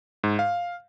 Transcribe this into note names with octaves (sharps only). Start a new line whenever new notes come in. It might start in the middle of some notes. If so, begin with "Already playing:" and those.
G#2
F5